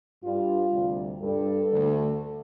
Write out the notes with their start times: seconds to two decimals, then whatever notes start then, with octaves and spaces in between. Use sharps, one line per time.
0.23 G2 G3 F4
0.72 D2 C3 G3
1.21 G2 G3 A4
1.71 D2 D3 A3